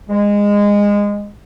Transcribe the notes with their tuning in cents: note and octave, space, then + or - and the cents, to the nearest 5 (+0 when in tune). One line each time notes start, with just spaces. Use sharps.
G#3 -20